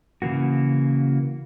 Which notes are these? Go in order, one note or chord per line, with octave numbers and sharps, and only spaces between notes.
C#3 E3 A#3 F#4